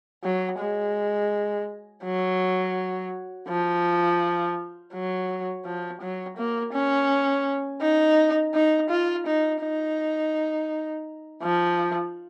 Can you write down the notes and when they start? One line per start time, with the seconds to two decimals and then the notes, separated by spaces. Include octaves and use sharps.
0.24 F#3
0.60 G#3
2.04 F#3
3.49 F3
4.94 F#3
5.65 F3
6.01 F#3
6.37 A#3
6.73 C#4
7.81 D#4
8.54 D#4
8.90 F4
9.27 D#4
9.62 D#4
11.43 F3